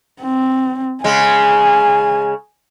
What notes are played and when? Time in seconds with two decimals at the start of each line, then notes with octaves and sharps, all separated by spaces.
0.21 C4
1.04 C#3 G#3 G#5